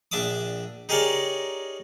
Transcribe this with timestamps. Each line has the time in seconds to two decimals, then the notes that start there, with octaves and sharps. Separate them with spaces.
0.12 A#1 D4 E5 D6 D#6
0.89 D#4 G4 G#4 A#4 C#5 D5